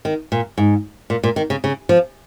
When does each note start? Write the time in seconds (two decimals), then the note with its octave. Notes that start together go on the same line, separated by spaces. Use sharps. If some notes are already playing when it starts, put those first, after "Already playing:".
0.05 D#3
0.32 A#2
0.58 G#2
1.10 A#2
1.23 A#2
1.36 D#3
1.50 C#3
1.64 C#3
1.89 F3